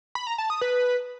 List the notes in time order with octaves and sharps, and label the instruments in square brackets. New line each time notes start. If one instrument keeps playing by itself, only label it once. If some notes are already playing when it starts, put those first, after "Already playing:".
[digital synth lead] B5
A#5
A5
D#6
B4